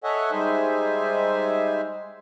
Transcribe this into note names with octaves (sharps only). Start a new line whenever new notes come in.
A4 C#5 D#5 E5 F#5 G#5
G3 G#3 D#4 C5 E5 G#5